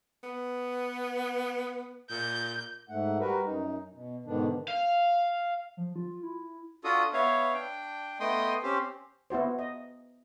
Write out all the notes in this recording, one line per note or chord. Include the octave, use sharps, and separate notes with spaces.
B3
A#2 G6
G#2 A3 F#5
G3 F#4 A#4 B4
F#2 D#4
B2
G#2 B2 D3 D#3 B3 D4
F5
F3
F4
E4
D4 F4 F#4 A4 D#6
B3 C#5 E5 F5
D4 G5
A3 B3 D#5 G5 C6 D#6
C4 C#4 G4 C5
B3 E4 F#4 C5
D#5